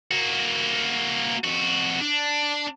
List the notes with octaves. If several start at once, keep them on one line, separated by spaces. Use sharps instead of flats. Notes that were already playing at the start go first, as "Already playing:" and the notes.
A#3 F#4
F2 F#4
D4